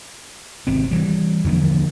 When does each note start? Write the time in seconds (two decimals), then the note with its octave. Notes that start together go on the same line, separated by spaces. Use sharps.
0.67 G#1 C3 C4
0.91 E3 G3
1.44 E2 D3 F3 A#3